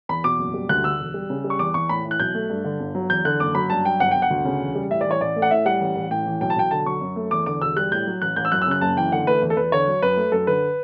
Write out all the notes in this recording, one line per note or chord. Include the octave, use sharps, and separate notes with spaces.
E2 B5
B2 D6
F#1
G3
D2 F#6
D3 E6
E1
G3
C#3
G3
C#6
E2 D6
E2 C#6
A2 B5
E3
F#6
B1 G6
A3
G2
D3
G1
F#3
E2 G6
D3 F#6
F#1 D6
F#3 B5
G2 A5
F#3 G5
G1 F#5
G1 G5
F#5
D2
C#3
E1
G3
A2 E5
D5
E3
C#5
A1 D5
A3
F#5
A2 E5
G3 F#5
A1
A1
A2 G5
E3
B1 G5
A5
B1 G5
D3 A5
F#3 C#6
F#2
A3
E2 D6
D3 D6
E1 E6
G3 F#6
A2 G6
F#3
A1 F#6
A1 G6
E6
F#2 F#6
E6
C#3 F#6
F#1 A5
E3 G5
D3 F#5
A3 B4
E2
A4
E2 B4
D3 C#5
F#3
F#2 B4
A3
F#2 A4
D3 B4